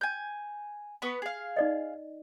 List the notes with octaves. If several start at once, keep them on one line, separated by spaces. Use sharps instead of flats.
G#5 G6
B3 B4 C#6
G#4 F5
D#4 D5 D#5